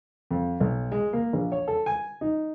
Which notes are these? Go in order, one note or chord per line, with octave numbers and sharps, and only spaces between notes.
F2
B1
G#3
A#3
A#1
C#5
A4
G#5
D#4